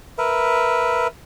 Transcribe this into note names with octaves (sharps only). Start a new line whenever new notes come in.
A#4 B4 E5